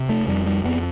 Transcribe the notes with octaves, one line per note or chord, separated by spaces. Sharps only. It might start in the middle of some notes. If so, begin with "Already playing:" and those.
Already playing: C3
A3
F2 G3
G3
F2 B3